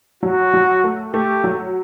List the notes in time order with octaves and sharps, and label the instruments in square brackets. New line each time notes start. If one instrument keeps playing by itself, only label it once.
[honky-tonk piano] F#3 [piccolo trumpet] F#4
[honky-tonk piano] F#3
A3
[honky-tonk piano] A3 [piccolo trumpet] G4
[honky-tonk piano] F#3